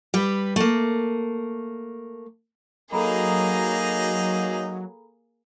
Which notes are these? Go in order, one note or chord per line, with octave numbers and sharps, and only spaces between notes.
G3 G4 B4
A3 A#3
F#3 A#3 D#4 G#4 A4 D#5 A#5 B5